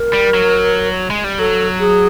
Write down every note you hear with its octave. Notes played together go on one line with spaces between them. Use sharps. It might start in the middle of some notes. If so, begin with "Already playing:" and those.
Already playing: A#4
G3
F#3
G#3
G3
F#3 A4
G#4